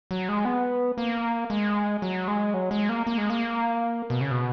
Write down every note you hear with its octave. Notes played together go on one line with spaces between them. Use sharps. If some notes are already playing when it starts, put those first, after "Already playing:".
F#3
G#3
B3
A#3
G#3
F#3
G#3
F#3
G#3
A#3
A#3
G#3
A#3
B2
C#3
B2